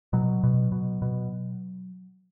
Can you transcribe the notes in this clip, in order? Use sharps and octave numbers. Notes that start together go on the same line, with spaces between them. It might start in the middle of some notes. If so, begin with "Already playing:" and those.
B2 F#3
B2
B2
B2